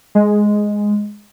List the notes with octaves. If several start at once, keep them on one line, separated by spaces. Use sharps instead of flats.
G#3